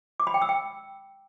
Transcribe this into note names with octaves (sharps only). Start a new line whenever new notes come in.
D6
B5
G5
E6
G5